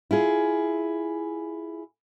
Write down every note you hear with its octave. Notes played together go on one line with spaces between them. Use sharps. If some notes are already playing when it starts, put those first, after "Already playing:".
E4 F4 G#4